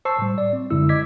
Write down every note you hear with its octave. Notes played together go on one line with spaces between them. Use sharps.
C5 A5 C#6 E6 C7
A2 G3
D5
C4
F#2 D3 G#3 E4 E6
D#5 D6 G#6 B6